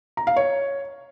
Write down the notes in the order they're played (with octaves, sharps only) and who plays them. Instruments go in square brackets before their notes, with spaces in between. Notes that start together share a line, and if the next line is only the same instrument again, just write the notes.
[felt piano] A#5
F5
C#5